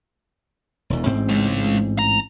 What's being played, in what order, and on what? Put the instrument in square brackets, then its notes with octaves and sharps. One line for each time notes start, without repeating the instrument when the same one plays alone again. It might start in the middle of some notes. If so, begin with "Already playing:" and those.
[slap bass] E1 E2
A1 G#2 C4
[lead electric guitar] G#3 C#4
A#5